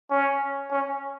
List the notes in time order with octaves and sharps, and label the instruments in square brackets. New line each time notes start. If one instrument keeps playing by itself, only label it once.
[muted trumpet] C#4
C#4